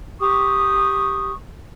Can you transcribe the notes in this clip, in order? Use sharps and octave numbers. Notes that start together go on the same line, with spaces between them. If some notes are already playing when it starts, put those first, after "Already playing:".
G4 C#6 D#6